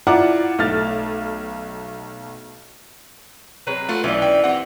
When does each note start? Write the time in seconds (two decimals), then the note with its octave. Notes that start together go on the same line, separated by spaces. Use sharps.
0.07 E4 F4 D5 F#5 A#5 D6
0.59 B1 A3 F6 A6
3.67 F#3 G#3 C4 B4
3.89 A3 F4 F#4
4.04 B1 E3 C#4 D5
4.22 G5
4.44 C4 G4 F#5